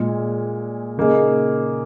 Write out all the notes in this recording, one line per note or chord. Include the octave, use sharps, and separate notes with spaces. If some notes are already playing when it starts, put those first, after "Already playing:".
Already playing: A#2 G#3 F4 G#4
C#3 A#3 D#4 G#4